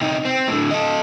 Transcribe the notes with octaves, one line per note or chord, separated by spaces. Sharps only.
C3 D#4
C4
A2 D3
A4 D#5